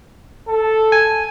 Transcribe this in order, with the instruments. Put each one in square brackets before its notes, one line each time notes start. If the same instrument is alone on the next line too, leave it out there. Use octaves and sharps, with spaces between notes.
[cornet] A4
[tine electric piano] G#5